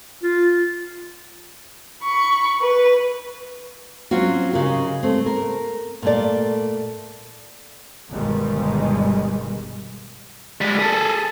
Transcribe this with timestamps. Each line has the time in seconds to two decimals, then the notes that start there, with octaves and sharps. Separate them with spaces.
0.23 F4
2.03 B5 C#6
2.61 B4
4.11 F#3 C4 C#4 F4 F#4
4.53 C#3 D#4 G4 A#4
5.03 A3 C4
5.26 A#4
6.02 A#2 A3 D5
8.11 G1 G2 B2 D#3 G3 G#3
10.61 G3 G#3
10.79 G#4 A4